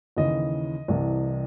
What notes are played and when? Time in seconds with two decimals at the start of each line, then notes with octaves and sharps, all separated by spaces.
0.17 D#2 C#3 E3 D#5
0.88 C2 C3 E3